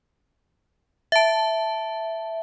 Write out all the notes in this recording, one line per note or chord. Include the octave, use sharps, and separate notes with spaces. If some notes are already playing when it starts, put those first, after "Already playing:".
E5 A5